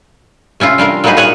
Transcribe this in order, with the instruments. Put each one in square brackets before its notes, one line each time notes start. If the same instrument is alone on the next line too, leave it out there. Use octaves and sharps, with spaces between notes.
[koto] C3 C#4 E4 F4
G3 D4 F4 A#4
F#3 G3 A#3 D#4 G#4 B4
A#2 F#3 G#4 C#5 F#5 G#5